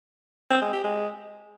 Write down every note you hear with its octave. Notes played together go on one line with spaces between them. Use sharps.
C4
G#3
G4
G#3